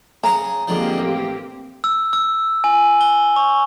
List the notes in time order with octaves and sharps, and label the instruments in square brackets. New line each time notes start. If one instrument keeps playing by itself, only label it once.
[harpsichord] C#3 G#4 C#5 [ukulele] A#5
[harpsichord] G#2 D3 F3 [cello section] A#3 C4 G4
[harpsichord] A1
[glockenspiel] E6
E6
G#5
G7
C#6